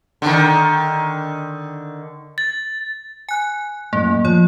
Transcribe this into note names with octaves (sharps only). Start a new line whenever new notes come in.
D3 D#3
A6
G#5 F#6
F#2 A2 A#3
F3 C#5